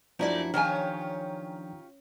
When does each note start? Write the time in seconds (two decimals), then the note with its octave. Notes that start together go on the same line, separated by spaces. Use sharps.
0.19 F#2 F3 A3 D4 E4 F#4 D5 A#5
0.54 D#3 C#4 F4 G4 C#5 G#5